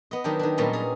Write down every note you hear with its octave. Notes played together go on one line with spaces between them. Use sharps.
B3 D#5
D#3 F#3 D4 G4
D#3 D4
A#2 F#3 G3 B3 C#4
G#4 A#5